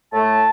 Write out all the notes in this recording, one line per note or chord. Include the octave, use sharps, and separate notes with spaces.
A2 A3 A5